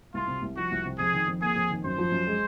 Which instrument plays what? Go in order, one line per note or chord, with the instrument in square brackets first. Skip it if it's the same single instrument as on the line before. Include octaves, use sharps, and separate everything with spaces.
[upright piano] C2 [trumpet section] F4
[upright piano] C3
C2
[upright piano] F3 [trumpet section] F#4
[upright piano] C2
C3
[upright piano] F2 [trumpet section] G#4
[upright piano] D#3
F2
[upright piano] A#3 [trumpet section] G#4
[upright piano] F2
D#3
[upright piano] F#2 [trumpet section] C5
[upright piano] F3
F#2
G#3